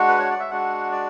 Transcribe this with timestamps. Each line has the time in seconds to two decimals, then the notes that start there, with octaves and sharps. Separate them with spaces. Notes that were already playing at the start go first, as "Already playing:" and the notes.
Already playing: G#3 D4 F#4 F#5
0.09 B4
0.19 C#5
0.30 D5
0.40 E5
0.50 G#3 D4 F#4 F#5
0.92 D5